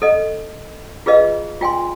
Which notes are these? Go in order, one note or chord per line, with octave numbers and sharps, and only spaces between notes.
A4 D#5
F4 G#4 B4 D#5 F5
F4 G5 G#5 C6